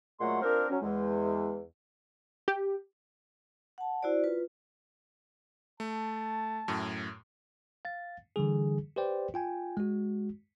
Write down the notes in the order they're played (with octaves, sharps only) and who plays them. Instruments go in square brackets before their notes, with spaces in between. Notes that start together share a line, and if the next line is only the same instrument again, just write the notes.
[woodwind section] A#2 F#3 G#3 A3 F#5 C6
C4 D4 F4 A#4
F#3 C#4
E2 G#3
[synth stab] G4
[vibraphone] F#5 A5
E4 F#4 C5 D5
F4 B4
[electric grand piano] A3 [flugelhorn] A5
[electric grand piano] F#2 A2
[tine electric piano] F5 A6
D3 E3 G3 G#4
G4 B4 C5 D5 G5
F4 G5 G#5
G#3 F#4